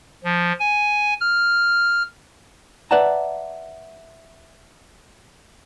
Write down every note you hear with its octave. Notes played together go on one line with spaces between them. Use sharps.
F3
G#5
F6
B4 D5 E5 F#5 A5 A#5